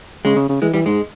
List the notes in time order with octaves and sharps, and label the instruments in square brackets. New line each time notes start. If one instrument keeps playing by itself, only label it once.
[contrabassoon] C#3 [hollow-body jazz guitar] G#3
[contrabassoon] C#3
C#3
[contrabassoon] E3 [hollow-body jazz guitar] G#3
[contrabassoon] E3 [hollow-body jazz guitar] G3
[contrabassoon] G#2 [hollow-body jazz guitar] G#3